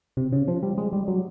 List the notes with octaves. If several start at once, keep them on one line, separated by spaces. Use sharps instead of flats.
C3
C#3
F3
G3
G#3
G3
F#3